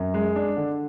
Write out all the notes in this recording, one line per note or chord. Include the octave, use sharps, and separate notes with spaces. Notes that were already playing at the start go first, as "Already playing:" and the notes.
Already playing: F#2
G#3
D4
D3